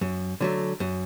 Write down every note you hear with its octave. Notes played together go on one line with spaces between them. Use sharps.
F#2
D3 F#3 A3
F#2